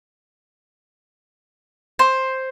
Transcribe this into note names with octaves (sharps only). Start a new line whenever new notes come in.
C5